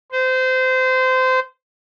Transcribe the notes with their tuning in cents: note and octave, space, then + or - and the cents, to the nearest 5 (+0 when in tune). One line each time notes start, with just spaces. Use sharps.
C5 -25